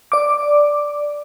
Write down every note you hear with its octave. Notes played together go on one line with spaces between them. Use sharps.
D5 D6